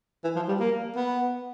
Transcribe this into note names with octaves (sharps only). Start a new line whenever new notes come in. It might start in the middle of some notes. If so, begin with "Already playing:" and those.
E3
F3
G3
A#3
B3